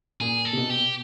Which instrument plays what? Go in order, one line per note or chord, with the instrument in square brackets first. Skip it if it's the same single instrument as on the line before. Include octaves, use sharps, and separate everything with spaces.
[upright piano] A#2 [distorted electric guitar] G#4
[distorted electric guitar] A4
[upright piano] C3
B2
[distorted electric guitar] G4